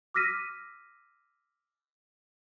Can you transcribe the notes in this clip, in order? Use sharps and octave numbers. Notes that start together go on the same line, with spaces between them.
D6 E6 F6 A#6 B6 D#7